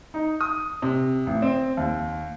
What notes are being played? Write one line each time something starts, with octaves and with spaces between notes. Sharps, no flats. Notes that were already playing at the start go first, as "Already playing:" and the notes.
D#4
D#6
C3
A1
C4
D#2